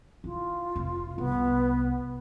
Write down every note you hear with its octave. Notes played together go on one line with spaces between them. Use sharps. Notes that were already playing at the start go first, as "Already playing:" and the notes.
E4 F4
F1
C2 B3